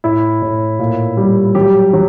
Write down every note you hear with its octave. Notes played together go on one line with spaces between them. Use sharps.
A2 E4
A2
A#2
G3
F#3 G4
F#3